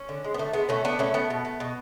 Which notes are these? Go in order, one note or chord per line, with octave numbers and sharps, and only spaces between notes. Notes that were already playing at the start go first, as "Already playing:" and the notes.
Already playing: C#4
D3
G#3
B3
D3 A3
G#3 B3
B2 A3 C#4
A3 B3 D4
B2 A3 C#4
A3 B3
B2
A3
B2